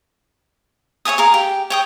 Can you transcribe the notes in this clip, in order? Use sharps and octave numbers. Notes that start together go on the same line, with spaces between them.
C#5 F5 G#5 D#6
G#4 A#4 F5
G4
C#5 G5 D#6